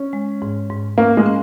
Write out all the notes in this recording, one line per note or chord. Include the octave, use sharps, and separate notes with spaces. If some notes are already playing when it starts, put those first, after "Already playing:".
Already playing: C#4
G#3
G#2
G#2
A#3 C#4
G#3
C#4